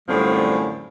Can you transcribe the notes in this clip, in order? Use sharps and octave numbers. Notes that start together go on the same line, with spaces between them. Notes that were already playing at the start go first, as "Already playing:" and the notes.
F#2 A2 D3 F3 G3 C4